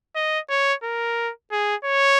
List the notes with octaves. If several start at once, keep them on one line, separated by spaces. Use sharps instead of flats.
D#5
C#5
A#4
G#4
C#5